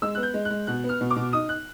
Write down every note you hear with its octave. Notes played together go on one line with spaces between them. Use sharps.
G#3 E6
B3 F#6
G6
G#3
F#6
G#3
B2 F#6
B3
F6
B2
D6
B2
D#4 D#6
F#6